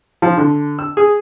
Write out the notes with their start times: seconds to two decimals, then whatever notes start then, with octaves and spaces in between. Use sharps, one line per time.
0.22 F3
0.38 D3
0.79 E6
0.97 G#4